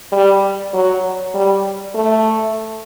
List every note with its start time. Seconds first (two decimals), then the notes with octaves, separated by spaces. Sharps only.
0.12 G3
0.74 F#3
1.34 G3
1.95 A3